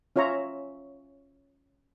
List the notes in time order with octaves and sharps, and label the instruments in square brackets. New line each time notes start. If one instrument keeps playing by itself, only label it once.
[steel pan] C#4 F4 C#5 E5 A#5